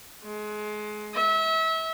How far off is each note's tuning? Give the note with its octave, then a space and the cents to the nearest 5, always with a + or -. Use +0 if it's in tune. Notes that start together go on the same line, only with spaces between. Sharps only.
G#3 +25
E5 -30